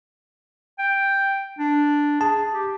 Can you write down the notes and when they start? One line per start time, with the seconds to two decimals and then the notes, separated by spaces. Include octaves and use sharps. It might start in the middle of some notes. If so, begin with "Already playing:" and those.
0.79 G5
1.59 D4
2.21 G#4 A5
2.54 G4